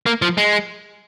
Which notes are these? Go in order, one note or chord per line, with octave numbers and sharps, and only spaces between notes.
A#3
F3
G#3